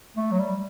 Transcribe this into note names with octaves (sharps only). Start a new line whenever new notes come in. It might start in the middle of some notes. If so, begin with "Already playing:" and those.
A3
F#3
G3